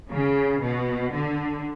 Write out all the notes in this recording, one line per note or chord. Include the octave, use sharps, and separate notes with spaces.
C#3
B2
D3